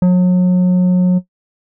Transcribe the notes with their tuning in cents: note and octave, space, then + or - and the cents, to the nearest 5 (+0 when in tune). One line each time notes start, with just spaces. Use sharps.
F#3 -35